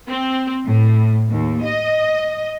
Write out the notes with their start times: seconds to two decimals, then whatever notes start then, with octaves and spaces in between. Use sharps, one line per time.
0.10 C4
0.67 A2
1.30 D#2
1.63 D#5